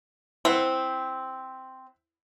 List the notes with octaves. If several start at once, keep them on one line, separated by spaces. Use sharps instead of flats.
C4 E4 C5 F#5